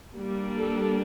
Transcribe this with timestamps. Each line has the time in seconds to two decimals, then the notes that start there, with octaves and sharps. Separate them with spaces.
0.15 G3 A#3 D4
0.56 A4